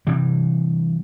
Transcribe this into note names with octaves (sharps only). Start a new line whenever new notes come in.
C3 E3 G3